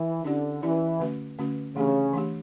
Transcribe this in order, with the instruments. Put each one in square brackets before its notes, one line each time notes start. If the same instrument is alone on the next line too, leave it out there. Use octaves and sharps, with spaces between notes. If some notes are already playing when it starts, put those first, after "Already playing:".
Already playing: [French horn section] E3
[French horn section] D3 [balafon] C#4 E4 G4 D5
[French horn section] E3 [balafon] C#4 E4 G4 D5
[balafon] D3 A3 C#4 F#4 B4
D3 A3 C#4 F#4 B4
[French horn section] C#3 [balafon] E3 A3 D4 G4
[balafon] E3 A3 D4 G4